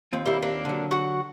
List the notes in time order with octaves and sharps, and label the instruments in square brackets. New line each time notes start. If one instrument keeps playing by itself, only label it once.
[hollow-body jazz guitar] D#2 C4 F4
[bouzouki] G3 A#3 E4
A#3 D4
[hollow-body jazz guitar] D3 F#3
[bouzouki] F#4 F#5